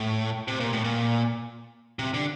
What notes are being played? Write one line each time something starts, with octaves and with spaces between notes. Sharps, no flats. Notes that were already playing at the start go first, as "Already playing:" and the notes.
Already playing: A2
C3
A#2
A2
A#2
C3
D3